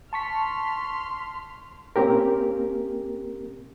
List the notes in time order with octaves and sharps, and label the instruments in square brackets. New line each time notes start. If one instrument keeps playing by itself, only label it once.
[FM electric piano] A5 C#6 B6 [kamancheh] C6 F6
[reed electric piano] A#3 C4 C#4 G4 A#4